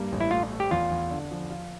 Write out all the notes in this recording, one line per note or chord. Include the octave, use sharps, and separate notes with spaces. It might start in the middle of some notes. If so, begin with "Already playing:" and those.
Already playing: G2 G3 A#3
A1
E4
A3 F4
A3
G4
E2 F4
E2
D3
F3
F4